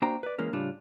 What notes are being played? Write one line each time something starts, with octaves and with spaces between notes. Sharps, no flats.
A#3 D4 F#4 C5 G5 A#5
B4 D5
E3 G#3 A#3 C#4
A2 C#3 G3 D4 F4